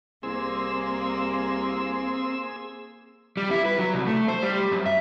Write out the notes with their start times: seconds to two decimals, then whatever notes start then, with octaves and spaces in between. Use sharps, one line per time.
0.23 C2 A#3 C4 G#4 E6
3.37 G3
3.51 E4
3.65 B4
3.79 F#3
3.94 C2
4.07 A3
4.28 C5
4.42 G3
4.72 F#2
4.86 E5